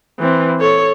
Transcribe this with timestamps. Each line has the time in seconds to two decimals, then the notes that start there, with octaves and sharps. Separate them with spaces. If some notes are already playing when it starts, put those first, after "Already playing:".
0.19 E3 C4
0.59 A4 C#5